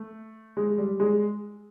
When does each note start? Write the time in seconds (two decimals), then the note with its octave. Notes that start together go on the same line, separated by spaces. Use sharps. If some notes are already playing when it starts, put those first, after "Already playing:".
Already playing: A3
0.57 G#3
0.78 G3
1.00 G#3